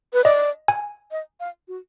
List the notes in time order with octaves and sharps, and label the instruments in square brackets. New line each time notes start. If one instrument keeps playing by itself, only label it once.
[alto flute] B4
[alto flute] D5 [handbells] D#5
[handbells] G#5
[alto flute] D#5
F5
F#4